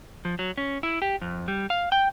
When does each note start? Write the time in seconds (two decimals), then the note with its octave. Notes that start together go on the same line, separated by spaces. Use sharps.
0.25 F3
0.39 F#3
0.58 C#4
0.83 E4
1.02 G4
1.21 F2
1.48 G3
1.70 F5
1.92 G5